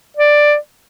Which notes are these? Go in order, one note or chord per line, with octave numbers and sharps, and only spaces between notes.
D5